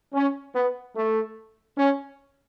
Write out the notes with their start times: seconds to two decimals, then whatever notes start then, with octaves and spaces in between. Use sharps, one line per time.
0.14 C#4
0.55 B3
0.96 A3
1.78 C#4